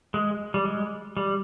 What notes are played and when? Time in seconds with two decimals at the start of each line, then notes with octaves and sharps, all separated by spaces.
0.14 G#3
0.54 G3
0.65 G#3
1.17 G3